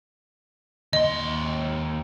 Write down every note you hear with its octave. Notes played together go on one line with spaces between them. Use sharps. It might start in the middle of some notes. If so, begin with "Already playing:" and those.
D#2 D#5 C6